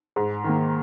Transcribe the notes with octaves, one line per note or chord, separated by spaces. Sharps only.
G#2
D#3 A#3